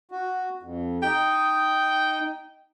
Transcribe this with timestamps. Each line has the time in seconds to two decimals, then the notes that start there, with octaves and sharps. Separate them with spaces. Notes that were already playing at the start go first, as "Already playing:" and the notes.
0.11 F#4
0.63 F2
1.03 D#4 G5